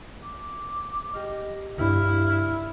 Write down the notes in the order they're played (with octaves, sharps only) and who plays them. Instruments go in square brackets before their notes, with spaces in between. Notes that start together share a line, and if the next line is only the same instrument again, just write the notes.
[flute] D6
[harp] G4 F6 [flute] D#5
[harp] G2 D4 [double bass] E4 [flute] F6
[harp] G#6